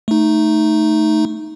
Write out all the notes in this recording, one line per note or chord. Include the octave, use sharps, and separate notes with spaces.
A3 D#4